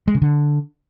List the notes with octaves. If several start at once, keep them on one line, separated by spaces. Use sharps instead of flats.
G#3
C#3
D3